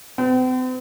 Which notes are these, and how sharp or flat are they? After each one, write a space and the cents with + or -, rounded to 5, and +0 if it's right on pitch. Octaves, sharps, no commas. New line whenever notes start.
C4 -45